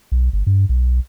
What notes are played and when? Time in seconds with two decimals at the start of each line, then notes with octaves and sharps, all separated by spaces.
0.12 B1
0.33 G1
0.47 G2
0.69 B1